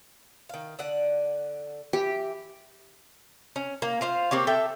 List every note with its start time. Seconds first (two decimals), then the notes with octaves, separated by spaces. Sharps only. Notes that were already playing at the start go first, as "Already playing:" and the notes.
0.49 D#3 F5
0.79 D3 D5 F#5
1.93 E3 G4
3.56 C#4
3.82 A#3
4.01 F4 C5 F5
4.31 A#3 C4 G4 C#5
4.47 A4 E5 G5